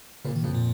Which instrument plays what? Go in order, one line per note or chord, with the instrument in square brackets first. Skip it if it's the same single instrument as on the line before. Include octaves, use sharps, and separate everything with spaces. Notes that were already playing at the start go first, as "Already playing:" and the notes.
[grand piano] A#2 A#3 [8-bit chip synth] C#3
[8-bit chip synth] D#3
[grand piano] F2 F3 [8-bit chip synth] C#3
[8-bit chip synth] A#2